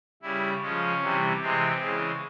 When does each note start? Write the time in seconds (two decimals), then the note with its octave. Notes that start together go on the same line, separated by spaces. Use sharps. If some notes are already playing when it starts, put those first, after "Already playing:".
0.22 C#3 G3 E4
0.62 C#3 F3 G#3 C#4
1.01 C3 E3 G3
1.40 C3 E3 G#3 C4
1.80 C#3 E3 G#3